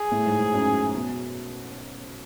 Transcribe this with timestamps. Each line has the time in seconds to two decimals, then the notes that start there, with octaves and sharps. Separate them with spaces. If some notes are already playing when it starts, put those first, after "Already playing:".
Already playing: G#4
0.12 A2
0.26 G#2
0.39 G#2
0.53 F#2
0.94 B2